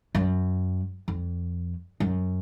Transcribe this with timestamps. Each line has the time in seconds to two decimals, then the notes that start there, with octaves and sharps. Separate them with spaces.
0.15 F#2
1.08 F2
2.00 F#2